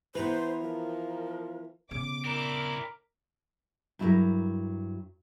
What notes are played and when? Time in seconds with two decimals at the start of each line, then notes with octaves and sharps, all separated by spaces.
0.15 E3 B3 B4 C5 A#5
0.61 F3 A#4
1.91 C#3 B3 D6
2.25 C4 D4 E4 A#4
3.99 G2 F#3 E4 F4 G#4 A#4